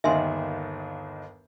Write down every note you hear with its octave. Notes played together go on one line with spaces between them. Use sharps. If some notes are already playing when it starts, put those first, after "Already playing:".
G1 D#2 D#3 E5 G#5 C6